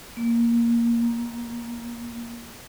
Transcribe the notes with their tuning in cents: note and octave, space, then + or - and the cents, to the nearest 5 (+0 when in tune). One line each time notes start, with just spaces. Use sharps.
A#3 +5
A#3 +15